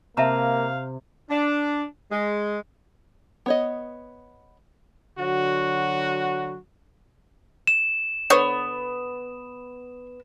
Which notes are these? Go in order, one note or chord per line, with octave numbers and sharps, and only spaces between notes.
C3 A#3 E5 F5 A5 A#5
D4
G#3
B3 C#5 D#5
D3 F#3 F#4
E7
D3 B3 C5 C#5